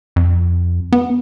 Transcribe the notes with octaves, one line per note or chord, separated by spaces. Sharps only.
F2
B3